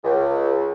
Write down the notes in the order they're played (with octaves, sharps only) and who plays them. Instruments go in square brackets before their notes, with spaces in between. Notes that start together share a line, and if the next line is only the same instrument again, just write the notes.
[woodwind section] C#2